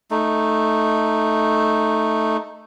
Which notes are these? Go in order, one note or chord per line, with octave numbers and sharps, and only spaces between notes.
A3 D#4